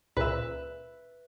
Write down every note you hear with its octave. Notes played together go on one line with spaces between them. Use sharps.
C#2 A#2 B4 E5